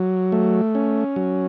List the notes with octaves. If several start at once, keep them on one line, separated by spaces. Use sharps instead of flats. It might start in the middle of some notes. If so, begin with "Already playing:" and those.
Already playing: F#3
A3
C#4
F#3